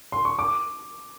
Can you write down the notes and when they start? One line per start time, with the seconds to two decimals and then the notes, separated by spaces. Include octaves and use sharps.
0.12 C6
0.25 C#6
0.39 D6